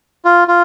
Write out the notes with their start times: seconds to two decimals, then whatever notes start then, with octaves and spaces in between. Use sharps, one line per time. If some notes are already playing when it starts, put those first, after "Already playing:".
0.25 F4
0.48 F4